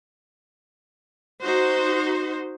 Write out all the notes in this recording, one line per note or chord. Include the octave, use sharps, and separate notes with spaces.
D#4 F#4 C5